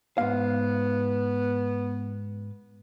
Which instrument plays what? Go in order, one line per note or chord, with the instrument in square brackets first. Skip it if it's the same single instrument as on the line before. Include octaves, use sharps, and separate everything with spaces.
[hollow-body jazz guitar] G#2 F5 [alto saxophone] B3